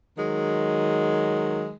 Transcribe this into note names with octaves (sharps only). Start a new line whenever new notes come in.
D#3 F#3 G#3